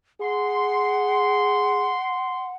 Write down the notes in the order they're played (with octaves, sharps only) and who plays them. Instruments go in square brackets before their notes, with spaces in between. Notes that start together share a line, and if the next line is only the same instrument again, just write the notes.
[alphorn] G#4 [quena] F#5 [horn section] C6